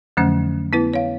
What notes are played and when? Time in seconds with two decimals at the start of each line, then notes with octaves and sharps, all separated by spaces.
0.17 F2 D3 F3 F#3 A3 C#4
0.73 B3 E4 B4
0.94 C#5 F5